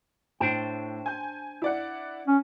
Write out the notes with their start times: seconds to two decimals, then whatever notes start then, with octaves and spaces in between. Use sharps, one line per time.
0.40 A2 D4 C5 G5
1.06 G#5 G6
1.62 E4 D5 F#5
2.27 C#4